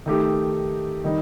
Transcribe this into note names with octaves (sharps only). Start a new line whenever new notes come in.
D#3 A3 D#4 G4
D#3 G3 D#4